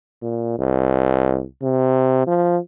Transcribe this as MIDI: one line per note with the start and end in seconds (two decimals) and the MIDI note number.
0.22 0.55 46
0.59 1.44 36
1.62 2.27 48
2.27 2.58 53